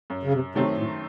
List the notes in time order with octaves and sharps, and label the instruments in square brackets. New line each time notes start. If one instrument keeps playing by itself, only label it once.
[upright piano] F#2
[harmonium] C#3
C3
[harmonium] C3 [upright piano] D#3 F#3 A3 C4
[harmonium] A2